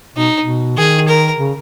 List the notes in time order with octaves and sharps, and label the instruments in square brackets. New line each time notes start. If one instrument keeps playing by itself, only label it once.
[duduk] B2 [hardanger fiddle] D#4
[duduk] B2
[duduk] D#3 [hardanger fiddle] G#4
[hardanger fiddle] A#4
[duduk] C#3